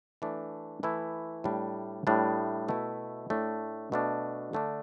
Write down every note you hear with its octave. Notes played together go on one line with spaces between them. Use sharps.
E3 A3 D4
E3 A3 E4
A2 G3 D4
A2 G3 D4
B2 A3 E4
A2 A3 D4
B2 A3 D4
D3 A3 D4